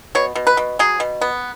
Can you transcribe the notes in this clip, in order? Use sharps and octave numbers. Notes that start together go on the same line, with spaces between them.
B2 C#5
B2
B4
B2
F#3 G#4
B2
B3